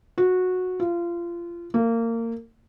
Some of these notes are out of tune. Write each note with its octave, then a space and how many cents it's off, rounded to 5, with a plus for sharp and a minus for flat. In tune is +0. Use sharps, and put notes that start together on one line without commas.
F#4 -15
F4 -25
A#3 -25